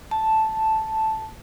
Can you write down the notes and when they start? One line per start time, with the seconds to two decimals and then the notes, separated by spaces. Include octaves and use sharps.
0.11 A5